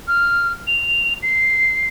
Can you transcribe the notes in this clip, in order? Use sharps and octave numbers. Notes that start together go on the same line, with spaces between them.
F6
F7
C7